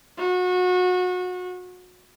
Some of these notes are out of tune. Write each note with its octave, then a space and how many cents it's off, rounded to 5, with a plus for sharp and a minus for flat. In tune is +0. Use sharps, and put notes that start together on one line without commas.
F#4 -30